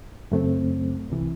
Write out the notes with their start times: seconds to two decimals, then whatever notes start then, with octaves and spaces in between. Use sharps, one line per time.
0.32 F#2 C#3 F#3 A3 C4
1.10 C2 C3 E3